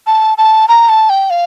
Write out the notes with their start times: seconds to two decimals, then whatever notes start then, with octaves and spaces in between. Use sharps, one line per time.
0.07 A5
0.38 A5
0.68 A#5
0.89 A5
1.10 G5
1.30 F5